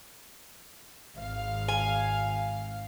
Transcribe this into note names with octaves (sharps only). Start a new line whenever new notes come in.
G#1 F5
G#5